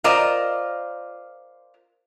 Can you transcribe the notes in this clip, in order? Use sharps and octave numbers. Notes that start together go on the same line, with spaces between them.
F4 A#4 C5 D5 D#5 F5